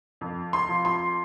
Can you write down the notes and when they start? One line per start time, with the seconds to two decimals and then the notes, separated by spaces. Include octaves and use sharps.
0.21 F2
0.53 C6
0.69 F3
0.85 C6